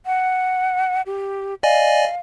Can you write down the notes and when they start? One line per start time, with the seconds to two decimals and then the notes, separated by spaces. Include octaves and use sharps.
0.06 F#5
1.06 G4
1.63 D5 D#5 F5 G#5